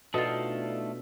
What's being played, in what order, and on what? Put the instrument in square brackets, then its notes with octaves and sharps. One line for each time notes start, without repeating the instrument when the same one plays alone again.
[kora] B2 [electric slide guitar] A3 D4 A4 [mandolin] D#4 F4